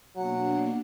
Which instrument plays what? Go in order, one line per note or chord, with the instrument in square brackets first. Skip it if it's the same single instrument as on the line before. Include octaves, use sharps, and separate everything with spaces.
[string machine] B2 A#3 D4 [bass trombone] F#3 [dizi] F#5